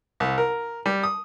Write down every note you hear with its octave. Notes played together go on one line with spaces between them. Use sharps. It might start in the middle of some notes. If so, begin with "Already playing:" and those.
C2
A#4
G3
D#6